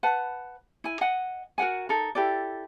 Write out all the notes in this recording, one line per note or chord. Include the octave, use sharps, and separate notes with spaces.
B4 F#5 A5
E4 G#5
D#5 F#5 G#5
F#4 A#4 F#5 G#5
D#4 A4 A#4
E4 G4 A4 D5